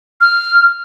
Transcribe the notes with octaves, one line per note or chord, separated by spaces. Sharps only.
F6